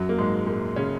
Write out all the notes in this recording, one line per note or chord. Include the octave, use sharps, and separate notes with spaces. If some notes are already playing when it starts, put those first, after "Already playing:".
Already playing: F#2 F#3
A#3
G#2 G#3
A#2 A#3
C#3 C#4